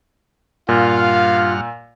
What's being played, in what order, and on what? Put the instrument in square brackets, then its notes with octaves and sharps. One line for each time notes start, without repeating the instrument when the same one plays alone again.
[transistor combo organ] G2 F#5 F6 [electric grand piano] A#2 [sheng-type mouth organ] F4 [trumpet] F5